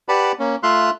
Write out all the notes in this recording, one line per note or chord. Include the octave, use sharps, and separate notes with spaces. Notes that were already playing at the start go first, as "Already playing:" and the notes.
G4 B4 D5 F#5 A5 B5
A#3 C#4
A3 F4 E5 F5 C6 F#6